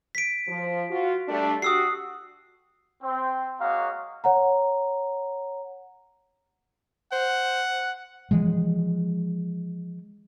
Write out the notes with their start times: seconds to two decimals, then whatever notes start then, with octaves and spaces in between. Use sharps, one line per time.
0.15 B6 D7
0.47 F3
0.89 F4 F#4
1.28 G3 A3 D4
1.62 F#4 G4 D#6 E6 C7
3.02 C4
3.60 G#3 A#3 F#4 C#5 F5 A#5
4.24 C#5 F#5 A#5
7.12 C5 F#5
8.31 E3 F3 G#3